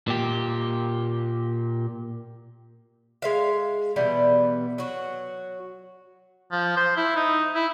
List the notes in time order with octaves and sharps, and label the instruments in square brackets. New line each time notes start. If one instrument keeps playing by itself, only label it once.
[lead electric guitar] A#2 G4
[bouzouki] G#3 E5 F5
B2 E3 G3 B3
F#3 F#4
[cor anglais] F3
C5
E4
D#4
E4